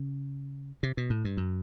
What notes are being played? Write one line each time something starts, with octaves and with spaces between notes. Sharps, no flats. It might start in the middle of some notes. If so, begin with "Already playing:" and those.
Already playing: C#3
C3
B2
A2
G2
F#2